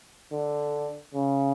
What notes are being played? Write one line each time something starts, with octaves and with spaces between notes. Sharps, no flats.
D3
C#3